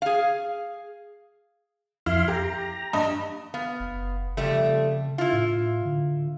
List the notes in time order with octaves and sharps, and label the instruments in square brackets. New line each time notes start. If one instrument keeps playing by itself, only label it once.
[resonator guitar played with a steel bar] G#4 F5
[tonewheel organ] F2 F5 C6 [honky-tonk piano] E4
[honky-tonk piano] G4 [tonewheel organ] A#5
[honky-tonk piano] G2 D#5
[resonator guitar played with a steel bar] B3 F5
[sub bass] F#1
[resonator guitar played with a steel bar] F2 G3 A3 [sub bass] C#3
[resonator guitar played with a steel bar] E4 F4
[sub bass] A2
D3